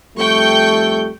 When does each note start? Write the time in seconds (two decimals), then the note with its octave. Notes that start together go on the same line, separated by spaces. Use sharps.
0.17 F2 G3 A3 G5 C#6 G6